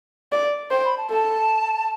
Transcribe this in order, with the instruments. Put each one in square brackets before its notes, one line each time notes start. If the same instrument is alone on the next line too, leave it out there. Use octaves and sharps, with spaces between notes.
[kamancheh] D5
[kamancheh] C5 [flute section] G5
[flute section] B5
A5
[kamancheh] A4 [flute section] A5